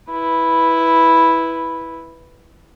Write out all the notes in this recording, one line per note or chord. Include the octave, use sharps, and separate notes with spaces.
E4 B4